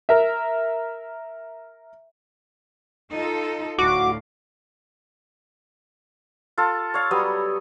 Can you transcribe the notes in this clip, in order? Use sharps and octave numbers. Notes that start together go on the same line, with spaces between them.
A#4 E5
D#4 F4 A4
D2 A2 F#4 F5 D6
F4 A4
C#5 F5
F#3 G3 B3 D#6